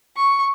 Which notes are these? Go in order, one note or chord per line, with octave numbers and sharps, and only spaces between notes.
C#6